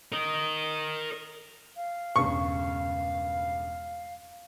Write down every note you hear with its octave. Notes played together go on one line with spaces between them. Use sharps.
A#4 D#5
F5
E1 G2 C#3 C#6